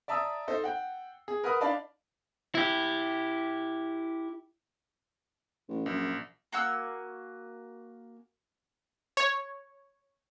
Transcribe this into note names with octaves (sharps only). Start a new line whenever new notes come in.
D5 E5 A5 A#5 D#6 E6
D#4 A4 C5 D#5
F#5 G5
G#4
A#4 B4 F#5 A#5 B5 D#6
D4 D#4 D5 F5 A5 B5
E4 G4
A1
A#1 F#2
A#3 F#4 G#5 E6
C#5